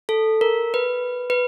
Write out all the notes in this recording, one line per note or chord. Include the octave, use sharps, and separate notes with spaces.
A4
A#4
B4
B4